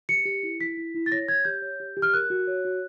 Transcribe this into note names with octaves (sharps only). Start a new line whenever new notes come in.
G4 C#7
G4
E4
E4 B6
E4
E4
A6
C#5 A#6
C#5 G#6
G4 G6
C#5
G4
G4
F6
A#4 F#6
F#4
C#5
F#4